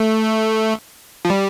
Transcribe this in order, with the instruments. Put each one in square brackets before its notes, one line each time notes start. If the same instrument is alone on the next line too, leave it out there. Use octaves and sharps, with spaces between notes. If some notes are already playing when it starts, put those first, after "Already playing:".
Already playing: [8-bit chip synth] A3
F3
G3